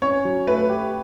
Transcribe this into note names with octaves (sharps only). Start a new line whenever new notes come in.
C#4 C#5
F#3
A3 B4
G4